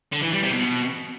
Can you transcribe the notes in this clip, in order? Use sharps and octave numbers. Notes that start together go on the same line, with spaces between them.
D3
E3
G3
C3
B2